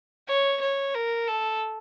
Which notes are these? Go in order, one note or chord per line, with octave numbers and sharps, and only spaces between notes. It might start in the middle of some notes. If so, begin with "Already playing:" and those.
C#5
C#5
A#4
A4